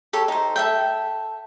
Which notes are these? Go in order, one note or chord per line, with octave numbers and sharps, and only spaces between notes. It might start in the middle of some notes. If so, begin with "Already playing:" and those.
G4 A4 C#5
D#4 C5
A4 E5 G5